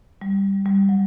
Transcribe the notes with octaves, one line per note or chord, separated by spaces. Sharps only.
G3
G3
F#3